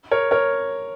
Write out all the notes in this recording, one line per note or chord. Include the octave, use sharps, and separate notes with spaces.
A#4 C#5
A#4 C#5